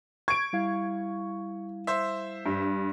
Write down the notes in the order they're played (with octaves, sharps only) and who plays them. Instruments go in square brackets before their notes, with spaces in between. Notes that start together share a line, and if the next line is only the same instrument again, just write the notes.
[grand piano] C#6 [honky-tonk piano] G#6 D7
[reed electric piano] G3 E4 F5
[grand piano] C5 E5
[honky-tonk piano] G2